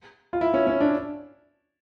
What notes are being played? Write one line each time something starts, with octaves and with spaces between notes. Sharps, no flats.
F4
E4
C#4
C#4
D4